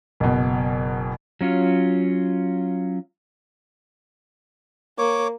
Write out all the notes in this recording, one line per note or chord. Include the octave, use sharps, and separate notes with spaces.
F#1 B2
F#3 C#4 F4
A#3 C#5 D6